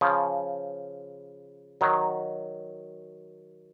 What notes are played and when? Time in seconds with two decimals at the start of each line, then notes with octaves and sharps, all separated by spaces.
0.01 C#3 F3
1.81 D#3 F#3